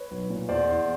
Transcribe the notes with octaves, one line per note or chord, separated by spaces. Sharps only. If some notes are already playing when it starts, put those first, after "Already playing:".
Already playing: B4 C#5
B1
A#2
E2 C5 D5
E2